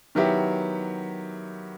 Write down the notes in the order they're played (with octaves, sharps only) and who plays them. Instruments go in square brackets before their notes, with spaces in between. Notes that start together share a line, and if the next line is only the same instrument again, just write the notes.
[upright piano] D#3 F#3 B3 E4 G4